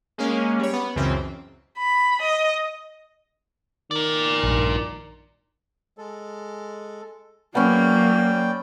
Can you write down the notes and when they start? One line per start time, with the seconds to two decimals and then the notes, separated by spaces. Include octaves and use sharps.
0.18 G#3 A#3 C#4
0.59 G3 C#5
0.73 B3
0.96 C#2 F#2 C#3 E3 C4
1.79 B5
2.21 D#5
3.91 D#3 A#4 D5
4.43 A#1 G2
5.98 G#3 A4
7.55 F#3 A#3 B3 C#4 D5 G5